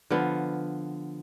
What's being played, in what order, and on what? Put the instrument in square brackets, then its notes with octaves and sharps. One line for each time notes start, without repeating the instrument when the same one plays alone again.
[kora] D3 F3 B3